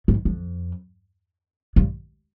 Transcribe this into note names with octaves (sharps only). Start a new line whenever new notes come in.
G#2
F2
G2